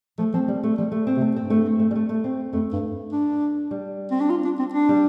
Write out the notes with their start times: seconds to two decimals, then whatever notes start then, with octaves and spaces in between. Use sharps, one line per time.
0.18 F3 A3
0.34 F3 C4
0.48 G3
0.63 A3
0.78 F3 G3
0.92 A3
1.07 C4
1.17 C3
1.21 A3
1.36 G2 C4
1.50 A3
1.66 C4
1.80 A3
1.91 G3
1.95 A3
2.09 A3
2.24 C4
2.53 F2 A3
2.73 G2
3.12 D4
3.71 G3
4.11 C4
4.20 D4
4.30 F4
4.45 D4
4.59 C4
4.73 D4
4.89 G3